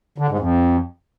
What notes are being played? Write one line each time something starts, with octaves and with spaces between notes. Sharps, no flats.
D3
G#2
F2